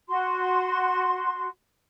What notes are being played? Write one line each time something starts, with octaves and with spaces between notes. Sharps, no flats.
F#4 C6